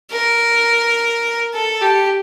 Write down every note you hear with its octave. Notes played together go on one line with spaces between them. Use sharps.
A#4
A4
G4